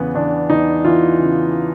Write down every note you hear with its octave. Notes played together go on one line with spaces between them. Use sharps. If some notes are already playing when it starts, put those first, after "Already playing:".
Already playing: E2 C#3 B3
E2 D4
E2 D#4
E3 F4
C#3